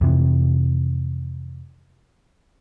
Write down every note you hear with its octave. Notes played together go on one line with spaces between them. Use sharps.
F2 C3 E3